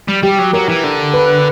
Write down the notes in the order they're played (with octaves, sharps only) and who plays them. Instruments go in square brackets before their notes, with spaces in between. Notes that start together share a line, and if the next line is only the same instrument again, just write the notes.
[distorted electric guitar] G3
[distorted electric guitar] G3 [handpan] G4
[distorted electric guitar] F#3
[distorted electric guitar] F#3 [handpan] A#4
[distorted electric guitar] E3
D3
[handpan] B4